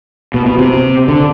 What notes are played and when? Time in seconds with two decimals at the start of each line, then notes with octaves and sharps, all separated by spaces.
0.34 B2
0.46 B2
0.58 C3
1.08 D3